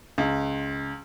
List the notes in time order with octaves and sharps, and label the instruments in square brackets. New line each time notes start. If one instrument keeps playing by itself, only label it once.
[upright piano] C#2